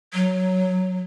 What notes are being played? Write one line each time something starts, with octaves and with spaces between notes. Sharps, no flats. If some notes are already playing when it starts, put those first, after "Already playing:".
F#3